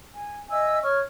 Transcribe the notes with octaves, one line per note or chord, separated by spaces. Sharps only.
G#5
D#5 E5 G#5 E6
C#5 C#6 F6